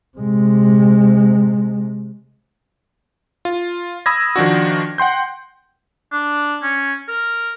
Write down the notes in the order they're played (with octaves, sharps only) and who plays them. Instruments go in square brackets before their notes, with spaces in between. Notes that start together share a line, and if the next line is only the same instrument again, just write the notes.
[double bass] C3 G#3
[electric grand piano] F4
B5 D#6 E6 G#6 A#6
D#3 F3 D4 F#4
F#5 G5 C6 G6
[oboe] D4
C#4
A#4